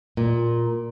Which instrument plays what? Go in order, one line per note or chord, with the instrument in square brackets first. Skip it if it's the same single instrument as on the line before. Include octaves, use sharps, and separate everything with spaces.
[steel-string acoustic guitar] A#2